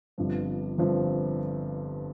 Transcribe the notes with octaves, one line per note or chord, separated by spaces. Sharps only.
G1 G2 F3 C4
G1 G2 F3 C4